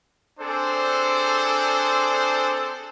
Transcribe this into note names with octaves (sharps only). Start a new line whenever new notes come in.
C4 D4 G#4 A4 C5